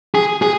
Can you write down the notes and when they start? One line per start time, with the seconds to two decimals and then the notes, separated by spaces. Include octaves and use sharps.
0.15 G#4
0.42 G#4